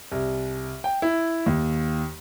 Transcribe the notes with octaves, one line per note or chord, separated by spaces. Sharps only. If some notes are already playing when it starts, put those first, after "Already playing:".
C2
G5
E4
D#2